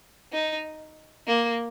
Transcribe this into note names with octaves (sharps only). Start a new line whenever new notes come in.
D#4
A#3